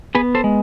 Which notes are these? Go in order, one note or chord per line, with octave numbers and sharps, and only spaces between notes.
B3 G#4 B4
A4 C5
G#3